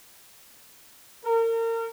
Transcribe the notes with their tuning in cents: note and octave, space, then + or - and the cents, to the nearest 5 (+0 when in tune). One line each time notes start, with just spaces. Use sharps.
A#4 -30